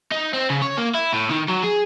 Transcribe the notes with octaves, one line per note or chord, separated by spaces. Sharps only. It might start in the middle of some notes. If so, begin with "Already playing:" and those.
D#4
C4
C#3
C#5
A#3
E4
A2
D#3
F#3
G#4